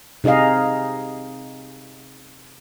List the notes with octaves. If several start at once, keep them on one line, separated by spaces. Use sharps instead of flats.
C3 D#4 G#4 D#5 F5